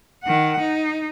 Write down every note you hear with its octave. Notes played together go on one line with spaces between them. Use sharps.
D#3 F#5
D#4